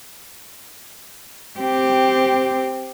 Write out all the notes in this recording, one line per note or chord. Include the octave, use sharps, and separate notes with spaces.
C4 G4